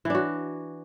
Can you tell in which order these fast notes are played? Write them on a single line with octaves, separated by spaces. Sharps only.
E3 D4 F#4